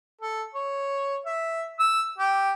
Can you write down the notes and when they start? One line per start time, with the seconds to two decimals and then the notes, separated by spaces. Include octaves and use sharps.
0.21 A4
0.54 C#5
1.25 E5
1.79 E6
2.18 G4